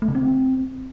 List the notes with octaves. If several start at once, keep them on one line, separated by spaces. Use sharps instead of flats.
A3
C#3
C4